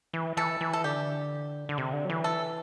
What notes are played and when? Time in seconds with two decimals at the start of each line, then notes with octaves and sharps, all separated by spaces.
0.13 E3
0.37 E3 A4
0.61 E3
0.73 A4
0.84 D3 G4
1.69 D3
1.78 C3
1.93 D3
2.05 F#3
2.10 E3
2.24 A4